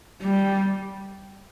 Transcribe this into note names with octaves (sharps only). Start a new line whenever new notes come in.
G3